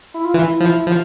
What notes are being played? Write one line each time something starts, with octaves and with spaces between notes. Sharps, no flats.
E4
F4
E3 E4
F3
F3